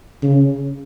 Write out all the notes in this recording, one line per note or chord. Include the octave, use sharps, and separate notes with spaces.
C#3